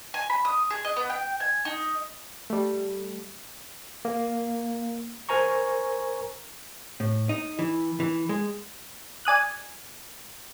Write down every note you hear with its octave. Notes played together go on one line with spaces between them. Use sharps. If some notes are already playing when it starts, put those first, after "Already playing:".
G#5
B5
D#6
G#4
D#5
B3
G5
G#5
D#4
G3 A3
A#3
A#4 C5 G#5 A#5 C#6
A2
D#4
E3
E3
G#3
D5 G#5 D#6 F#6